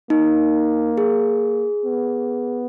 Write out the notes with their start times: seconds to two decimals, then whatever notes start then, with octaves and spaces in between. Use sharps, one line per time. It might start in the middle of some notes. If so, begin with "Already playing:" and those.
0.10 A#3 D#4
0.97 G#4
1.85 B3